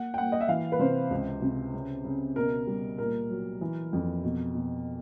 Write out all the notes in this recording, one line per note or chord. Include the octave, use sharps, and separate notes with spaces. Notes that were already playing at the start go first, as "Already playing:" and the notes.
Already playing: A#3 F#5
G5
A#3 F#5
D#5
E5
E3 F5
B4
C3 C5
C#2
C3
C#3
C#3
B2 A#4
G3
A#2 A#4
F#3
E3
F2
B2
B2